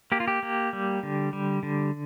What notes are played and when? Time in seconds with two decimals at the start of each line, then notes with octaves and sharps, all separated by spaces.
0.12 A#3 G4
0.20 F4
0.28 G4
0.43 A#3
0.73 G3
1.03 D3
1.33 G3
1.63 D3